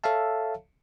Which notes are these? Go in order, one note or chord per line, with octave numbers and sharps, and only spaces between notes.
A4 C#5 E5 F5 A5